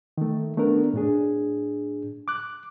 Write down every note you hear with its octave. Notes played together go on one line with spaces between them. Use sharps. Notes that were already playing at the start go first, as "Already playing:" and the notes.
D#3 A3
A3 B3 D4 A#4
A2 D4 G#4
D6 F#6